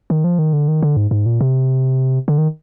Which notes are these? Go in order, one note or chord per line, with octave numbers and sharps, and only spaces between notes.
D#3
F3
D#3
D3
D#3
D3
G#2
G#2
A#2
C3
D3
D#3